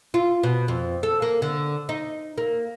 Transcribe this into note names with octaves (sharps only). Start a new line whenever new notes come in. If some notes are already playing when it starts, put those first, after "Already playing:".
F4
B2
F2
A4
A#3
D3
D#4
A#3